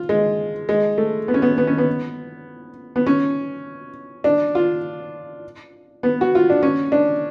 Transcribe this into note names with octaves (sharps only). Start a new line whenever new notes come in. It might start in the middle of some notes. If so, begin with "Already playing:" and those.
Already playing: F4
G#3
G#3
A3
B3
C#4
B3
B3
C#4
B3
B3
C#4
D4
F4
B3
F#4
F4
D4
C#4
D4